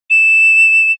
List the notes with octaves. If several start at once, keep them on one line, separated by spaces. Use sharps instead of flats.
E7